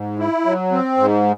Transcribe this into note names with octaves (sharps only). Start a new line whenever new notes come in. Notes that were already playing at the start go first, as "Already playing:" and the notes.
Already playing: G#2
E4
F#3
C4
G#2